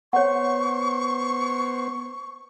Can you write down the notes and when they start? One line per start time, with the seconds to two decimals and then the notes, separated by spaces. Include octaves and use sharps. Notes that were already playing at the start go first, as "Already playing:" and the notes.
0.13 B3 C5 C#5 F#5 C#6